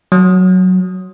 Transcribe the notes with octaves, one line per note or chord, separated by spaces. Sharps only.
F#3